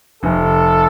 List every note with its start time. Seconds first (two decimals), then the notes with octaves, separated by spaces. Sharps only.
0.23 F1 A4